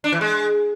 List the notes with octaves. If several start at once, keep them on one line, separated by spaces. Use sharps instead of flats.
D4
E3
G#3